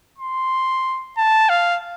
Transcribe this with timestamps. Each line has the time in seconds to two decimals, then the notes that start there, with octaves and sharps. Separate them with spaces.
0.18 C6
1.17 A5
1.49 F5